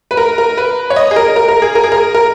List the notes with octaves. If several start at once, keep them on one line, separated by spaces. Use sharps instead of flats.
B4
A#4
A#4
B4
C#5
D#5
G#4
A#4
A#4
A#4
G#4
A#4
G#4
A#4
A#4